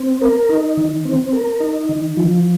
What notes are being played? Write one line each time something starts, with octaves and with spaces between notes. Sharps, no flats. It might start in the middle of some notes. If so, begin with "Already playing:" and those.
Already playing: C4
A#4
D#4
D#3
C4
A#4
D#4
D#3
F3